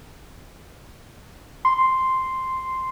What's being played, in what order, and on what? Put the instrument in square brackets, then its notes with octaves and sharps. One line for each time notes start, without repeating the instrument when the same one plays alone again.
[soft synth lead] C6